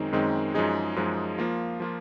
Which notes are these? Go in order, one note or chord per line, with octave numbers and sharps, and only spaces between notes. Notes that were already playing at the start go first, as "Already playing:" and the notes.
Already playing: F#2 D#3 G#3 C4 D#4
F#2 D#3 G#3 C4 D#4
F#2 F3 G#3 D#4 G#4
F#2 F3 G#3 D#4 G#4
F3 A#3 F4
F3 A#3 F4